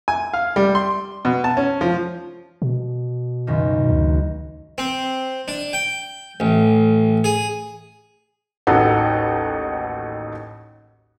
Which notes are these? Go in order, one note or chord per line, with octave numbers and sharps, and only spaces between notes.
G#5
F5
G3
C6
B2
A5
C#4
F3
B2
C#2 F#2 D#3
D2
C4
D4
G5
A1
G#4
A1 D#2 D#4 F#4 A4 F#5